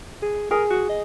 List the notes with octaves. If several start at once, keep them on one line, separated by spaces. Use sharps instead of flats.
G#4
G#4 A#4
F#4
D#5